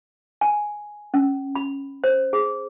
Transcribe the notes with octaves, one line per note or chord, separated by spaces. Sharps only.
G#5
C#4
B5
C5
G#4